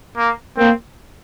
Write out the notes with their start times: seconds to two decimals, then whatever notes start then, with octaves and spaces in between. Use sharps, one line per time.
0.18 A#3
0.58 A#3 C4